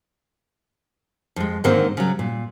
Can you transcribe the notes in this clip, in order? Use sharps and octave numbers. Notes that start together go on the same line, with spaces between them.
F2 G#3
G#2 D3 D#3 G#3 A#3 C4
C#3 F#3
A#2